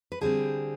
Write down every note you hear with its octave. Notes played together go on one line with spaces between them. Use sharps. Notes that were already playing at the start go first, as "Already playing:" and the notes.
B4
D3 G3 C4 G#4